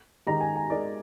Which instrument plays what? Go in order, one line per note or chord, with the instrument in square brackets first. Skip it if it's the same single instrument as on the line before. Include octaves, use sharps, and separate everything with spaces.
[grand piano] D#3 G#3 D#4 G4 [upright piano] A#5
[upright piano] G#5
G#5
[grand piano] G#3 D#4 A#4 D5